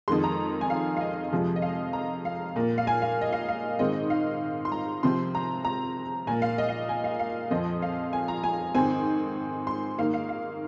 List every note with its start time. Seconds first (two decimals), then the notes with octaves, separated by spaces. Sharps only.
0.08 F2 D#3 G#3 C6
0.24 A#5
0.61 G#5
0.70 F5
0.97 F5
1.01 D#5
1.32 F2 C3 F3 G#3
1.56 D#5
1.62 F5
1.93 A#5
2.25 F5
2.56 A#2 A#3
2.78 F5
2.87 G#5
3.02 F5
3.21 D#5
3.33 F5
3.49 F5
3.79 G#2 D#3 G#3 C4 D#5
4.10 F5
4.65 C6
4.72 A#5
5.03 C3 F3 C4 C6
5.35 A#5
5.65 A#5
6.27 A#2 G#5
6.30 A#3
6.42 F5
6.58 D#5
6.69 F5
6.89 G#5
7.04 F5
7.19 F5
7.51 F2 F3 C4 D#5
7.82 F5
8.13 G#5
8.28 A#5
8.44 G#5
8.75 G#2 D#3 C4 G#5
9.67 C6
9.98 G#2 D#3 A#3 F5
10.14 F5
10.29 F5